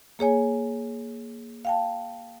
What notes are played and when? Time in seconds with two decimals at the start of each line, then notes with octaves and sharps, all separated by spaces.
0.19 A#3 G#4 C#5 G#5
1.65 F5 G5 A5